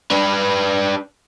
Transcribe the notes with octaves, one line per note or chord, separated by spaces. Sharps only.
D4 B4